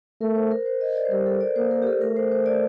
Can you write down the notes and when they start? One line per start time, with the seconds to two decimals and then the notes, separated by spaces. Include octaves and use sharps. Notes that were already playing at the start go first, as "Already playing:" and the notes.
0.21 A3 A#4
0.35 C5
0.51 A#4
0.66 C5
0.81 D#5
0.96 D5
1.05 C5
1.11 G3 A#4
1.26 A4
1.41 D5
1.56 A#3 C5
1.71 A#4
1.82 G4
1.87 A4
2.01 A3 A#4
2.17 C5
2.32 C5
2.46 D5